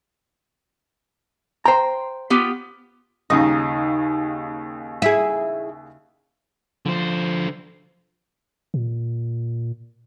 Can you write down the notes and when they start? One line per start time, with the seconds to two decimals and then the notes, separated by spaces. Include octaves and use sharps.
1.66 C5 G5 A#5
2.30 B3 F4 G4
3.30 D#2 C#3 D#4 D#6
5.02 E4 G#4
6.86 D3 F3 C5
8.74 A#2